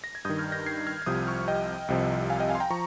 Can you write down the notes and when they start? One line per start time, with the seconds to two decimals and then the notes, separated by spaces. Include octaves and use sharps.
0.04 A#6
0.15 G#6
0.25 G2 D#3 D#6 G6
0.38 F6 G#6
0.52 G6 A#6
0.66 G#6 C7
0.87 F6 G#6
1.02 G#6
1.06 C2 C3 F3 D#6 G6
1.27 C#6 F6
1.48 D#5 G5
1.88 C2 C3 F3
2.30 F5 G#5
2.40 D#5 G5
2.50 F5 G#5
2.55 C6
2.60 G5 A#5
2.70 F3 A#5 C#6